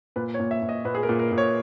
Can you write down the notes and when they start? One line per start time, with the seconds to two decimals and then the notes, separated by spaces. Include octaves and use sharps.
0.16 A#2 B4
0.34 C#5
0.40 A#2
0.51 E5
0.62 A#2
0.69 D#5
0.85 A#2 B4
0.95 G#4
1.03 A#4
1.09 A#2
1.19 A#4
1.32 A#2
1.38 C#5